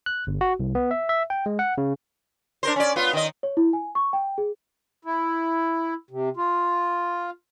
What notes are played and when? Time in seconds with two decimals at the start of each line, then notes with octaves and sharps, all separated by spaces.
0.06 F#6
0.27 G1
0.41 F#4
0.60 C2
0.75 B3
0.91 E5
1.09 E5
1.30 G5
1.46 G#3
1.59 F#5
1.78 C#3
2.63 D4 A#4 C5
2.76 C#4 D5
2.96 B3 F4
3.13 D#3 D#5
3.43 C#5
3.57 E4
3.73 G#5
3.95 C#6
4.13 G5
4.38 G#4
5.05 E4
6.11 C3
6.37 F4